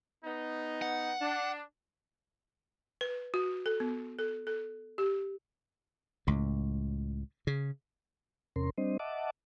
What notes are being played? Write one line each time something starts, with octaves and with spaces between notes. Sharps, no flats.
B3 D#4
F#5
D4
B4
F#4
A4
B3
A4
A4
G4
C#2 A2
C#3
E2 C3 C#4 A#4 C6
G3 C4 D4 C5 D#5
D#5 E5 F#5 A5 D6